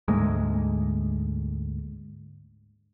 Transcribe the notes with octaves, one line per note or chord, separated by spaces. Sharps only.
D2 G#2 G#3 A#3